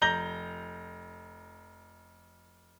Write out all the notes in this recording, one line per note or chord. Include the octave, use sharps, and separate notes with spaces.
F1 A#5 G6 A#6 G7